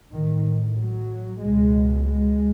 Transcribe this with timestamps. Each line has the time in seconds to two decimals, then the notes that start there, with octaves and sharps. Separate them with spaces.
0.12 A1 A2 D#3
0.76 F#3
1.40 C#2 B2 G#3
2.03 G#3